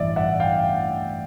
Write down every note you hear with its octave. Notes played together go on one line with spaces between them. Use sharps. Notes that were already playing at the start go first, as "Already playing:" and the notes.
Already playing: A1 G2 E3 D5 E5
E5 F#5
F5 G5